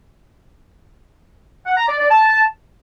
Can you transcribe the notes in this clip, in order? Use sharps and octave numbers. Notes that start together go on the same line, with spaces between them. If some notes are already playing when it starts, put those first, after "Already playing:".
F#5
A#5
D5
D5
A5